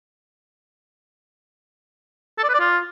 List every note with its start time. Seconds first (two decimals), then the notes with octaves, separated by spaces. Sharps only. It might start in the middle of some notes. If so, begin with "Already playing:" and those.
2.38 A4
2.43 D5
2.49 B4
2.54 D5
2.59 F4